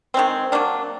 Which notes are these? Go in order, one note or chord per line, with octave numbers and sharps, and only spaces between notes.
D#3 G#3 C4
F#3 A#3 D4